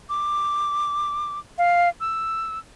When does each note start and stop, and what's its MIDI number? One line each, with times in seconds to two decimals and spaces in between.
0.09 1.39 86
1.58 1.89 77
2.01 2.59 88